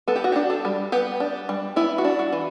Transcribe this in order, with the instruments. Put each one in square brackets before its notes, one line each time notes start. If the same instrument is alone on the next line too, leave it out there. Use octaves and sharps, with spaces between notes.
[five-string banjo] B3 A4
G4
F#4
D4 G4
A4
G3
B3 G4
D4
G3
B3 E4
F#4
D4
F#4
E3